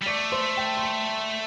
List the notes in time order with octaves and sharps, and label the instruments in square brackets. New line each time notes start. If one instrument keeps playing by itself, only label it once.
[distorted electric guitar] G3
[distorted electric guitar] A3 [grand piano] D5 D6
[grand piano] C5 C6
G5
C6
A5